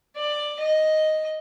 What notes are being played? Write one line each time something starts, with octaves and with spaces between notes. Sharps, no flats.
D5
D#5